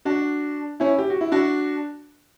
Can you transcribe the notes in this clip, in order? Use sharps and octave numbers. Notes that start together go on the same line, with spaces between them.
D4 F#4
C#4 E4
G4
F#4
E4
D4 F#4